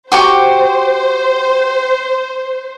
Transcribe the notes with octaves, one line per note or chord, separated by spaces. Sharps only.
F#4 G4 C5 C#6